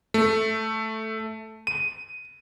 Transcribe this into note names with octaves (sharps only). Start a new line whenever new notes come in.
A3
D#7